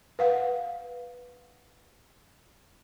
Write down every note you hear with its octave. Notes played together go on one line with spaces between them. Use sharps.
B4 F5 F#5